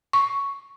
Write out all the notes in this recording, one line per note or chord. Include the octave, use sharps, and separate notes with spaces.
C#6